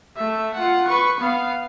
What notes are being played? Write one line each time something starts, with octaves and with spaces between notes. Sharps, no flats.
A3 E5
F4 F#5
B4 C#6
B3 F5